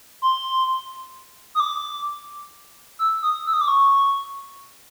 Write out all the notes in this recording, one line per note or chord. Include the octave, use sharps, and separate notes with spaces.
C6
D#6
D6
E6
D#6
E6
D#6
D6
C#6